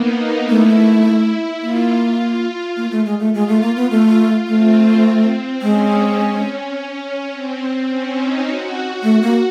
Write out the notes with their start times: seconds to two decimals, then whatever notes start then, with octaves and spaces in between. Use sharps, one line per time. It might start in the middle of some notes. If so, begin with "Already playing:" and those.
Already playing: A#3 B3 D#4
0.49 A3 E4
1.63 A#3 F4
2.77 A#3
2.91 A3
3.05 G#3
3.20 A3
3.34 G#3 F4
3.48 A3
3.62 A#3
3.76 B3
3.91 A3
4.48 A3 C4
5.62 G#3 C#4
6.75 C#4
7.32 C4
7.61 C4
7.89 C#4
8.18 D#4
8.46 F#4
9.03 A3
9.22 A#3